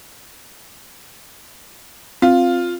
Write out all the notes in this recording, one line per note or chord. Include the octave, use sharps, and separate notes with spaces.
C4 F4